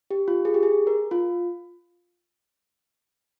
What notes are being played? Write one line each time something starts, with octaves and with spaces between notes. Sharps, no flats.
G4
F4
G#4
G4
G#4
A#4
F4